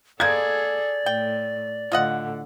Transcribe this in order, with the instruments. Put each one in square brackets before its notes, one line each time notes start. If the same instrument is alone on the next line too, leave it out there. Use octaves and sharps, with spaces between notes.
[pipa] G#3 A#3 [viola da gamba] G#4 A4 [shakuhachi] D5 [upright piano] G#6
[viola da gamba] A2 [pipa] G5
[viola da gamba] A2 D3 [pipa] F4 D#5 F#5